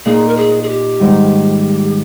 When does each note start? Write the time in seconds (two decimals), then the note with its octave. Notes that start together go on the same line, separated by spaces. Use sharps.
0.05 A#2 A#3 D#4 G#4
0.28 A#4
0.37 G#4
0.63 G#4
0.69 G4
1.00 G#2 D#3 G3